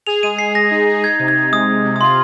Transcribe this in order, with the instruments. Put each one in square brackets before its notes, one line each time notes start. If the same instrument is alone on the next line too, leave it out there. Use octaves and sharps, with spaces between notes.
[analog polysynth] G#4 [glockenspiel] F7
[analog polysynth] G#3 [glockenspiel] D#7
[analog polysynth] G#3 [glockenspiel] C7
[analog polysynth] G#3 [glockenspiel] A#6
[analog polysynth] D#4
D#4
[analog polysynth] D#4 [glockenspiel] G#6
[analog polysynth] C3
[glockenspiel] G#6
[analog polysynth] D#4
[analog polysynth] G#3 [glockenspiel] D#6
[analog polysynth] C3
C3
[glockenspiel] D#6
[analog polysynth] F4 [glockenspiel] C6